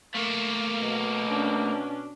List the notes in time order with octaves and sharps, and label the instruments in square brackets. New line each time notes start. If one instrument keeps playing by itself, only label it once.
[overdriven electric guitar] A3 A#3 [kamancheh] F5
[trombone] B2
[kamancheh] C#4 D4